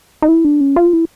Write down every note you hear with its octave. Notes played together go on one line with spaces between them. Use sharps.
D#4
E4
D4
C#4
F4
E4